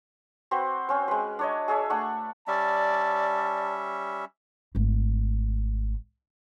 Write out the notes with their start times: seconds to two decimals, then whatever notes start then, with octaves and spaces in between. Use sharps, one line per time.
0.51 C4 F#4 B4 C5
0.89 C4 C#4 C5
1.08 G#3 B4
1.39 D4 C#5 D#5
1.68 G#4 A4 C#5 E5
1.90 A3 D4 F#5 C#6
2.48 G3 C#4 D5 E5 A5
4.75 G#1 A3